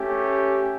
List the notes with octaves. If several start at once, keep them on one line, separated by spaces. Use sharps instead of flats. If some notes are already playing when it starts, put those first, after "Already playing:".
Already playing: A3 C#4 G4